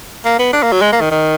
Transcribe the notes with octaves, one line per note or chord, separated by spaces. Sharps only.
A#3
B3
D4
A#3
F#3
G#3
A#3
D#3
D#3